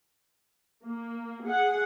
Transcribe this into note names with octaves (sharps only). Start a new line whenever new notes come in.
A#3
G#4 F#5